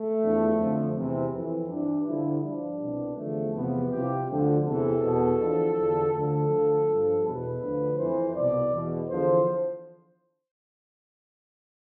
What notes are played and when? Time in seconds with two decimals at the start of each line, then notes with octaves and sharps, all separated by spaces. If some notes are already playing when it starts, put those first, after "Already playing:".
Already playing: A3
0.21 E2 D3 F3
0.58 F2 D3 F3
0.95 E2 C3 E3 C4
1.33 F2 E3
1.69 G2 E3 D4
2.07 G2 D3 F3 E4
2.43 G2 F3 D4
2.80 C2 B2
3.17 E2 D3 F3 A3
3.54 E2 C3 F3 B3
3.91 C2 C3 F3 G4
4.29 D2 D3 F3
4.65 E2 C3 E3 A4
5.02 E2 B2
5.40 E2 D3 F3
5.77 E2 D3 F3
6.14 D2 D3 F3 A4
6.50 D2 D3 F3
6.87 G2 F3
7.24 E2 B2 B4
7.62 D2 D3 F3
7.98 F2 E3 C5
8.36 C2 B2 D5
8.72 E2 B2
9.09 E2 D3 F3 C5